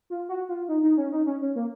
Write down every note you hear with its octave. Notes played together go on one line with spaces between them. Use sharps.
F4
F#4
F4
D#4
D#4
C#4
D#4
C#4
C#4
A#3